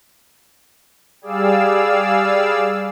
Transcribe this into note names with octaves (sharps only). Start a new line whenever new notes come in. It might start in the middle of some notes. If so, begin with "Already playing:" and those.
G3 G#4 D5 F5 E6